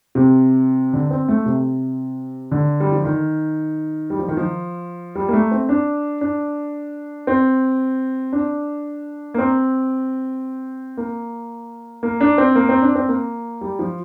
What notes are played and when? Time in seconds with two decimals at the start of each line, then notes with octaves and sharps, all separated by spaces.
0.15 C3
0.93 D3
1.11 C4
1.28 A3
1.46 C3
2.51 D3
2.80 G3
2.92 F3
3.04 D#3
4.10 G3
4.19 F3
4.28 D#3
4.37 F3
5.15 G3
5.28 A#3
5.33 A3
5.51 C4
5.69 D4
6.21 D4
7.27 C4
8.33 D4
9.34 A#3
9.38 C4
10.97 A#3
12.03 A#3
12.21 D4
12.38 C4
12.55 A#3
12.69 C4
12.82 D4
12.95 C4
13.08 A#3
13.61 G3
13.79 F3